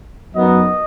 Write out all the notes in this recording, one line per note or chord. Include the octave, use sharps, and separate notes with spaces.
F#2 F#3 B3 D#4 D#5